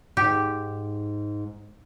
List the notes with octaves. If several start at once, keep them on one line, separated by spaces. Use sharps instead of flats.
G#2 G4